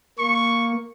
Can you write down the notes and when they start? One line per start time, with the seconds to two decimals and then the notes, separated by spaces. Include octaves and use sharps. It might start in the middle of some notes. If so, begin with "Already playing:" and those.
0.19 A#3 C#6